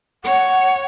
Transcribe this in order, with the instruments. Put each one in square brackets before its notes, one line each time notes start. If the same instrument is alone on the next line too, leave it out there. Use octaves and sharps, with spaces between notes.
[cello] C#5 [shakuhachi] F#5